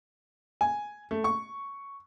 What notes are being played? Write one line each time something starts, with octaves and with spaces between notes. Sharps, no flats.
G#5
A3
C#6